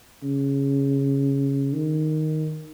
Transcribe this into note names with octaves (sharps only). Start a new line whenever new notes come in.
C#3
D#3